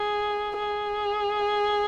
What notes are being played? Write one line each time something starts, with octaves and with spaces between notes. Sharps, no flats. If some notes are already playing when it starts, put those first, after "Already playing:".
Already playing: G#4
G#4